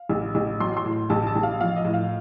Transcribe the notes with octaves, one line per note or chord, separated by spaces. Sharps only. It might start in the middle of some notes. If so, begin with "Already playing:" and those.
Already playing: F5
A1
A1
F#3 C6
C6
A2
A1 A5
A5
A1
F5
F3 F5
D#5
A2
F5